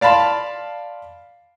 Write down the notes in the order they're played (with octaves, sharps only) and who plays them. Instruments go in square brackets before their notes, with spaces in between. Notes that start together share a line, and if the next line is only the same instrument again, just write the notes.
[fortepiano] D5 F5 A5 B5 C6